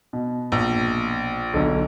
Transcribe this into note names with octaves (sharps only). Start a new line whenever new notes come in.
B2
A#1
B1 D3 A4